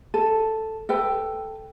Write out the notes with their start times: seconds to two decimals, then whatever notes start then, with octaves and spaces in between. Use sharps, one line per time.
0.14 A4
0.89 A4 B4 G5